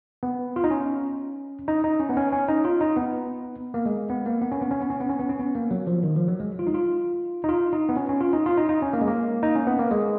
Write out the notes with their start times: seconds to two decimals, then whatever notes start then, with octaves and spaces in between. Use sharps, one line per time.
0.23 B3
0.56 F4
0.64 D#4
0.71 C#4
1.68 D#4
1.84 D#4
1.99 C#4
2.10 B3
2.17 C#4
2.32 C#4
2.48 D#4
2.65 F4
2.81 D#4
2.97 B3
3.74 A#3
3.86 G#3
4.10 B3
4.26 A#3
4.42 B3
4.52 C#4
4.61 B3
4.71 C#4
4.81 B3
4.90 C#4
5.01 B3
5.10 C#4
5.19 B3
5.29 C#4
5.39 B3
5.55 A#3
5.71 F#3
5.87 F3
6.03 D#3
6.16 F3
6.28 F#3
6.40 G#3
6.59 F4
6.67 D#4
6.74 F4
7.44 D#4
7.49 F4
7.73 D#4
7.89 B3
7.96 C#4
8.09 C#4
8.21 F4
8.33 D#4
8.46 F4
8.57 D#4
8.69 D#4
8.82 C#4
8.93 A#3
9.01 G#3
9.07 A#3
9.43 D#4
9.55 C#4
9.66 B3
9.79 A#3
9.91 G#3